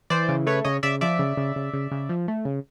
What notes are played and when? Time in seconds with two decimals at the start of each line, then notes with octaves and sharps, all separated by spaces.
0.10 E3 C5 D5
0.28 C#3
0.46 A3 B4 C#5
0.64 C#3 C#5 D#5
0.83 C#3 D5 E5
1.01 F3 D5 E5
1.19 C#3
1.37 C#3
1.56 C#3
1.73 C#3
1.91 C#3
2.09 F3
2.28 A3
2.45 C#3